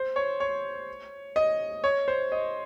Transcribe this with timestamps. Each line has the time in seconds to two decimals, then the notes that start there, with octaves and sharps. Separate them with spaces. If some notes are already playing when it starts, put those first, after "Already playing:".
Already playing: C5
0.16 C#5
0.40 C#5
1.36 D#5
1.84 C#5
2.08 C5
2.32 D#5